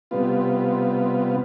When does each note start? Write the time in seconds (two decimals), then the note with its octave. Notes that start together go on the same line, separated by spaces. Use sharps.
0.11 C3 G3 B3 F4